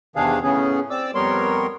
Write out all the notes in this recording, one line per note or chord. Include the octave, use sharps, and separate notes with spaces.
E2 C3 D#3 D4 G#4 F5
A2 C#3 B3 C#4 G#4
C4 D5 D6 E6
F2 G3 B3 A#4 C#5 C6